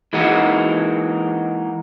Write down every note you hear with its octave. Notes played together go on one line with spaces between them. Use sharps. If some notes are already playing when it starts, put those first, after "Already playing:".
E3 G#3 A#3 D#4 F#4